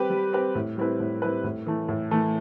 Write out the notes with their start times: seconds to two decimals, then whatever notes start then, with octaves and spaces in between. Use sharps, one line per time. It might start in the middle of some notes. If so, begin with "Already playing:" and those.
Already playing: G3 C4 G4 B4
0.10 G3
0.33 C4 G4 B4
0.55 A2
0.77 G3 C4 E4 B4
1.00 A2
1.22 G3 C4 E4 B4
1.44 A2
1.67 E3 A3
1.89 A2
2.11 E3 A3